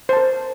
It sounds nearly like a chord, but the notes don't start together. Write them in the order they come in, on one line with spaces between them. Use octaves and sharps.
C5 A5 A#4